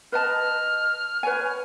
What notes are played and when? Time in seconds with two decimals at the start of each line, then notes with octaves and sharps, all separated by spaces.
0.12 B4 D#5 A5 F6
1.23 B4 C#5 G#5